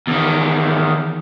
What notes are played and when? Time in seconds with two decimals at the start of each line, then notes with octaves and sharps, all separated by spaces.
0.07 E2 D#3